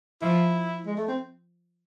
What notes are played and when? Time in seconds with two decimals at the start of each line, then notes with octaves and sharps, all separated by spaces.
0.22 F3 E4
0.86 G#3
0.97 A3
1.08 C4